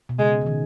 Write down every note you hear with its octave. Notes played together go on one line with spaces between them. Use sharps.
B2
C#3 G#3
C#3
D#3